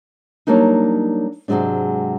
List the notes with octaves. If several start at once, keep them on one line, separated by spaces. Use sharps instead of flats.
F#3 G3 A#3 D4 D#4
G#2 C3 D#3 F#3 G#3 D4